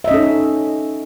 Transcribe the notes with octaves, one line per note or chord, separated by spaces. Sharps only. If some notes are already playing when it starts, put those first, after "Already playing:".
C#4 D#4 A4 D#5 E5